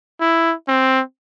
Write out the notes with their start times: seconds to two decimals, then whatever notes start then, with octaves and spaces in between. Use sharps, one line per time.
0.21 E4
0.68 C4